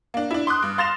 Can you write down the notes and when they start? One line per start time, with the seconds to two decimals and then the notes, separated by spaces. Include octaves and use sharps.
0.14 A#3 D4
0.31 D4 E4
0.47 C6 D6 D#6 F#6
0.62 G2
0.78 F5 C6 A6 A#6 E7 F7